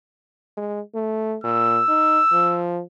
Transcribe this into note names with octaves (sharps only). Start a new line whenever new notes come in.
G#3
A3
A#2 E6
D#4
F3